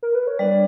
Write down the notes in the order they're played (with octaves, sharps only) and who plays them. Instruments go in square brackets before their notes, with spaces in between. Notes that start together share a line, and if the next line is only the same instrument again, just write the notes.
[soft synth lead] A#4
B4
C#5
[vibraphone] G3 B3 D4 [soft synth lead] D5